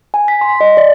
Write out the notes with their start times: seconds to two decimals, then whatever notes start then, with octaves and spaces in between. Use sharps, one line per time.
0.14 G#5
0.28 B6
0.41 C6
0.61 D#5
0.77 D5